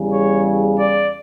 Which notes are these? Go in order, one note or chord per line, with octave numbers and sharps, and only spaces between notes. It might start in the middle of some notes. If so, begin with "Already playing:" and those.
Already playing: E2 C#3 G3
C#5
D5